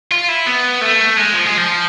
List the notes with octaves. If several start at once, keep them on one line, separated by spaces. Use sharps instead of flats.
F4
E4
B3
A3
G#3
F3
G#3
F3